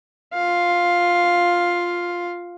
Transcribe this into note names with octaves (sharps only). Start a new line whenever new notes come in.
F4 F5